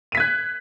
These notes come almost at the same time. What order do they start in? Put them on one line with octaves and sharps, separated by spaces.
D#7 B6 G#6 F#6